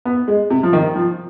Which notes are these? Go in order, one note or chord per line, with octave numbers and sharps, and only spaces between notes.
B3
G#3
C3
F3
D#3
F3